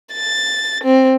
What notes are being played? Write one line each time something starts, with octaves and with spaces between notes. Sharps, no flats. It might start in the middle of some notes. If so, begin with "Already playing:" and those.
A6
C4